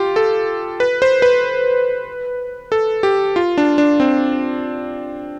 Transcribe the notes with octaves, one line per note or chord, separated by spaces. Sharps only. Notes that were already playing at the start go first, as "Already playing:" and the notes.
Already playing: F4 G4
A4
B4
C5
B4
A4
G4
F4
D4
D4
C4